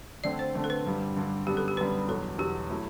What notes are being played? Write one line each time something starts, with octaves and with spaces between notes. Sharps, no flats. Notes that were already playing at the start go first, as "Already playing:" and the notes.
D3 A3 C4 D5
C5
D3 A3 C4
A4
B4
G2 D3 G3
G2 D3 G3
F#2 D3 G3 B3 G4
A4
G4
F#2 D3 G3 B3 B4
E2 B2 F#3 A4
E2 B2 F#3 G4
F#3 A3 E4